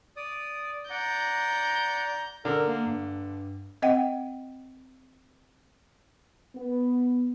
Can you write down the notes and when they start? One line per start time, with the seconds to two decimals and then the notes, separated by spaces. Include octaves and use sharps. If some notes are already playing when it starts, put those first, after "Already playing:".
0.17 D5 D#6
0.90 D5 F#5 A#5 G6
2.45 D3 A#4
2.68 A#3
2.87 G2
3.82 C4 D#5 F#5 G5
6.56 B3